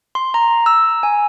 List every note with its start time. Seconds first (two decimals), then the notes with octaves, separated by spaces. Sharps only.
0.15 C6
0.34 A#5
0.66 E6
1.03 G#5